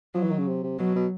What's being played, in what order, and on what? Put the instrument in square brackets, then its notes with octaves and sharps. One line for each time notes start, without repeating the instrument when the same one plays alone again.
[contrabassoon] F3 [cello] F#3
[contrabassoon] E3
D#3
C#3
C3
C3
[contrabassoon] B2 [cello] F#3
[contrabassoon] B2